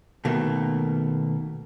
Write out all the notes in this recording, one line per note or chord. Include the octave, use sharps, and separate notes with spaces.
B2 D#3 A3 A#3